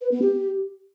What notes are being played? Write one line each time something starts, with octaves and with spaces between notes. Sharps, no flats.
B4
B3
G4